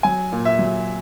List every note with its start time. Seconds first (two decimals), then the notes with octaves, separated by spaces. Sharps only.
0.03 F#3 G#5
0.32 A#2
0.45 E5
0.59 F#3